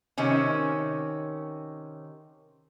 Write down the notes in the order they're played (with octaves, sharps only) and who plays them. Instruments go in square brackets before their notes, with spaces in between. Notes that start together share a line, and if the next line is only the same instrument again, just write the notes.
[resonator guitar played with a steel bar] C3 D#3 C#4